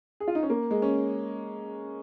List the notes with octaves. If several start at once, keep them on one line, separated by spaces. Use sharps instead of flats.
G#4
F4
D#4
C#4
A#3
G#3
C#4